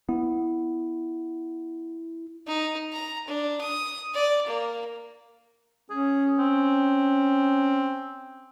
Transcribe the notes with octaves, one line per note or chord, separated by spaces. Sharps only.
B3 E4
D#4
A#5
D4
D#6
D5
A#3
C#4 G#4
C4